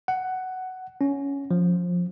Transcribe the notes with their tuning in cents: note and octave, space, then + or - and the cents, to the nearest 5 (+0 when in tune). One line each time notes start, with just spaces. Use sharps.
F#5 +10
C#4 +10
F3 +20